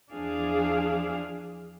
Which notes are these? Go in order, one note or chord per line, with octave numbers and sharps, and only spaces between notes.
E2 F3 D4 G#4 F5